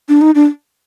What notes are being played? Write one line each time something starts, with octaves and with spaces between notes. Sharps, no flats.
D4
D#4
D4